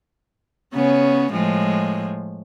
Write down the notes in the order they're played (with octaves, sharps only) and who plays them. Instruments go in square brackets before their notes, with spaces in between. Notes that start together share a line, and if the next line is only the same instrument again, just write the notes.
[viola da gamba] C#3 B3 C#4
A2 F3 G#3